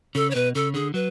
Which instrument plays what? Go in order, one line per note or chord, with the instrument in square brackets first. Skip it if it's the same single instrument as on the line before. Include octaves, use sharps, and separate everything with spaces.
[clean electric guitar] C#3 [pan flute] A4
[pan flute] C#5
[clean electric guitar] B2 [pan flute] B4
[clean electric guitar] C#3 [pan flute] A4
[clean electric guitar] D3 [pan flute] G#4
[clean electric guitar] F#3 [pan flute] B4